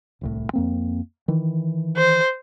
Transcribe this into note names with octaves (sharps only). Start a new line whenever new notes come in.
D1 C2 A2
F2 A#3 C4
D#3 E3
C5